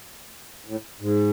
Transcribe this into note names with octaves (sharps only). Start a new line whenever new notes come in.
A2
G#2